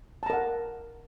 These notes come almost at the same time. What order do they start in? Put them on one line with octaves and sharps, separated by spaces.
A5 A#5 A#4 F#5